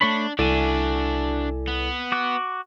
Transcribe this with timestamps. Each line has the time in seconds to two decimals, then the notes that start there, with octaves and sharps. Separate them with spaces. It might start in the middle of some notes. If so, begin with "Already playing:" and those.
0.01 A3 D4 C#5 B5
0.39 C2 D4 E4 F#4 A4 D5 E5 G#5
1.68 B3
2.12 F#4 D6 F#6